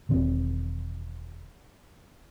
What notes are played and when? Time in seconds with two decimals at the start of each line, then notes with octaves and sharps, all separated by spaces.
0.09 E1 D#3 C4